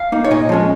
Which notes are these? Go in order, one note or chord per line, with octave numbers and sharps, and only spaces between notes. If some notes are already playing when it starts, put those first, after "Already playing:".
Already playing: F5
A#3 D#4
C#5
A#2 D#5
F3 G#3 C#4